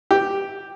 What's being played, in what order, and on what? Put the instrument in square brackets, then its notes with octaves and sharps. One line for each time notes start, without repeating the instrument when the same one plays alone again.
[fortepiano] G4